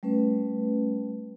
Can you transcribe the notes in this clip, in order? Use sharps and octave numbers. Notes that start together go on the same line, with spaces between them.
G3 A3 C#4 B4